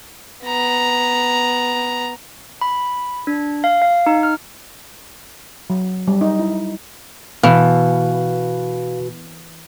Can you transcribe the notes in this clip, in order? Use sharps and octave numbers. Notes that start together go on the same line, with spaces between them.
B3 A#5
B5
D4
F5
F5
D#4
F6
F#3
G3
D#4
E4
B2 E3 F5